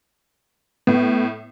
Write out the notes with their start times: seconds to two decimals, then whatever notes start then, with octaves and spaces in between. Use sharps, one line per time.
0.87 A2 B3